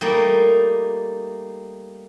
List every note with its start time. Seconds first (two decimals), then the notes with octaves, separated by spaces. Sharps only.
0.01 G3 A3 A#3 D#4